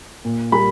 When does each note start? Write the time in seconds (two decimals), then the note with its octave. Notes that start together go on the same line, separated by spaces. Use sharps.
0.25 A#2
0.52 G3 A#3 B5